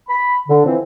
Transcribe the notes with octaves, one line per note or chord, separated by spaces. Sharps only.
B5
D3
E3 F3 C4